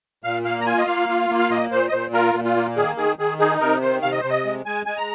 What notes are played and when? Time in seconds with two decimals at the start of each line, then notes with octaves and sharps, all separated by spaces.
0.24 A#2 F5
0.45 A#3 F5
0.61 A#5
0.66 F4 G#5
0.78 D#5
0.87 A#3 F5
1.09 F4
1.30 A#3
1.39 F5
1.50 A#2 D#5
1.71 A#2 C5
1.88 D#5
1.92 A#2 C5
2.13 F4 A#4
2.34 A#2
2.45 F4
2.56 A#3
2.76 D#3 G#4
2.97 D#3 G#4
3.19 D#3 G#4
3.39 D#4 G#4
3.61 C3 A#4
3.82 D#3 C5
4.02 C3 F5
4.12 D#5
4.21 C3 C5
4.30 D#5
4.44 G#3
4.66 G#3 G#5
4.86 G#3 G#5
4.97 A#5